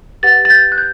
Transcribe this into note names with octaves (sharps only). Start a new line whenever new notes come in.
G4 B4 F#5 A6
A6
G6
F#6
G6